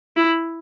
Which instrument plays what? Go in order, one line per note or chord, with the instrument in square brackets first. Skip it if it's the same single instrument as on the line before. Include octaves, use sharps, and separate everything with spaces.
[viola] E4